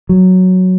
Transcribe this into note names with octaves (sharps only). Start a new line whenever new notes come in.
F#3